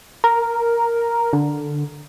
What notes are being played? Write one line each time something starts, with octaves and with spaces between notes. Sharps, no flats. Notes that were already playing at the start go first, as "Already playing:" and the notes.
A#4
D3